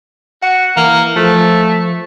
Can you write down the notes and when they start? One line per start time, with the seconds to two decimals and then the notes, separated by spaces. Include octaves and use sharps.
0.42 F#4 F#5
0.77 E3 A#3
1.16 F3 A3